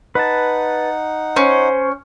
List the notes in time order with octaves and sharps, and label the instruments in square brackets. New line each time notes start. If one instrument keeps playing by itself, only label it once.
[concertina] D#4 F#5 [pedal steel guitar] B4 A5
[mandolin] C#4 [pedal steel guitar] C5